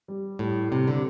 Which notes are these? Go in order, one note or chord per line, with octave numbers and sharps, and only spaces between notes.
G3
A2 G3
C3 C4
D3